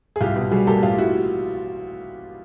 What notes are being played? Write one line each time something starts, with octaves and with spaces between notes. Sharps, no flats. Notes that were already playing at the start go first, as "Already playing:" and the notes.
G#4
C2 F4 G4
B2
G3 F#4 G#4
A#3 G4 A4
A1 F4 G4
E4 F#4